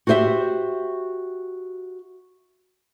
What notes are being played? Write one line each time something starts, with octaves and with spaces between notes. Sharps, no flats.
F#4 G4 C5 D#5 E5